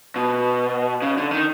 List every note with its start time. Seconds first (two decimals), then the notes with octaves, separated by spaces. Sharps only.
0.16 B2
1.02 C#3
1.17 D3
1.31 D#3